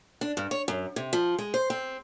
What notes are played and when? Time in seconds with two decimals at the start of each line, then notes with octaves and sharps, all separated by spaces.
0.21 D4
0.37 G2
0.51 C#5
0.68 F#2
0.96 C3
1.13 F3
1.38 G#3
1.54 C5
1.70 C4